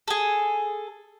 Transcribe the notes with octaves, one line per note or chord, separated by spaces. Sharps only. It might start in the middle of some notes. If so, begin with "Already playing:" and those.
G#4 A4